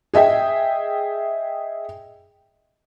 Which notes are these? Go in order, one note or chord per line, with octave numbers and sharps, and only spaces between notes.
G#4 D#5 E5 G5